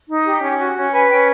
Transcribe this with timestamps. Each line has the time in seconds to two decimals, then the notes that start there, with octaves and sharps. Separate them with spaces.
0.09 D#4
0.25 G4
0.43 C#4
0.59 F#4
0.77 C#4
0.93 B4 G#5
1.10 C#4 G5